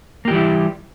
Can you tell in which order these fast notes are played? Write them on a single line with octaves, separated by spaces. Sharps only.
A#3 G4 E3 G3 E4